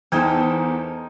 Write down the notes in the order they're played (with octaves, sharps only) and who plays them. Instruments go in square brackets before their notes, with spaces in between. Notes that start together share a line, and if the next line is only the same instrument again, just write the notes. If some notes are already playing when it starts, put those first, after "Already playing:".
[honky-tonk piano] E2 [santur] D#4 A#4 G5 [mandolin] A4 C5 G#5